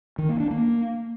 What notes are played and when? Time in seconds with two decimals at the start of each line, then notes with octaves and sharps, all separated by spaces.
0.18 D#3
0.29 A#3
0.40 D4
0.51 A#3